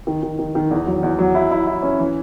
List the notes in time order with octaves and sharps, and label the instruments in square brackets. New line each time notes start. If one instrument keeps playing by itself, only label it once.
[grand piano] D#3
D#3
D#3
D#3
E2
F#3
E2
F#3
E4
E4
E4
C#4
E3